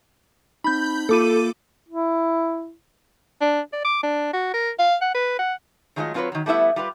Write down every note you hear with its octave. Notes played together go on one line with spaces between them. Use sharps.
C4 D#4 B5 G6
A#3 F4 A4 D6 D#7
E4
D4
D5
D6
D4
F#4
A#4
F5
F#5
B4
F#5
D#3 F#3 G#3 A3 F4 D#5
F#3 C4 F4 A4 B4 C#5
D#3 F#3
G3 A3 B3 E4 E5
G3 F4 G4 B4